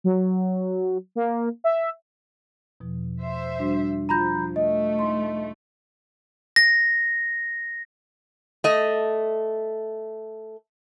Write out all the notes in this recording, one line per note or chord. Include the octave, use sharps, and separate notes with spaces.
F#3
A#3
E5
E2 B2 F3
C5 E5
G3 D4 F#4
F3 F4 A#5 B5 G6 A#6
A3 D#5
D#4 C6
A#6
A3 D#5